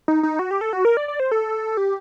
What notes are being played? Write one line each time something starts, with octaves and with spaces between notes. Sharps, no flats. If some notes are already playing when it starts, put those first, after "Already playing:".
D#4
D#4
F#4
G4
A4
F#4
A#4
D5
D5
C5
A4
G4